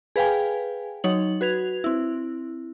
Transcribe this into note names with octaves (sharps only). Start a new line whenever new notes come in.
G#4 B4 F5 G5 G#5
F#3 D#4 C#5 F#7
F#4 B4 G#6 F7
C4 E4